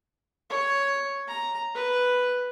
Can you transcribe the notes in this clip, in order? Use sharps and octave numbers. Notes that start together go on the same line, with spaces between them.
C#5
A#5
B4